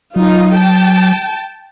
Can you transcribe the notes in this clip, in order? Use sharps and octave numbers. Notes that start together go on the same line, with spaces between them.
F#3 D#4 F4
G5 A5